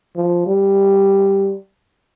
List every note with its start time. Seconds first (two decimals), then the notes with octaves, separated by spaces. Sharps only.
0.16 F3
0.46 G3